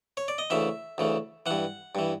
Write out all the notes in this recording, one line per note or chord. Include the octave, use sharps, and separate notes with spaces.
C#5
D5
D#5
D2 C#3 E3 E5
D2 C#3 E3
G2 E3 F#5
G2 E3